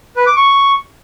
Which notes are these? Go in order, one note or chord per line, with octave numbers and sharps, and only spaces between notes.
B4
D6
C#6